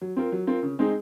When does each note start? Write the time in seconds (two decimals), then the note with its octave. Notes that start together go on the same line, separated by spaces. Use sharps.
0.01 F#3
0.17 C4 F4 A#4
0.32 F#3
0.47 C4 F4 A#4
0.63 C#3
0.79 G#3 C4 D#4 G#4